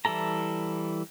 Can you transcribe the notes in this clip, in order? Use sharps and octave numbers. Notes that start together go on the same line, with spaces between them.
E3 G3 E4 A4 A#5